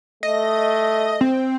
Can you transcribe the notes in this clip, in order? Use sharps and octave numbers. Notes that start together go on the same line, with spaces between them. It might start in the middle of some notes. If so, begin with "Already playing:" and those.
A3 D#5
C4